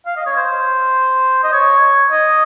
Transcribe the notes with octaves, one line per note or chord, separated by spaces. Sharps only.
F5
D#5
C#5
C5
D#5
C#5
D#5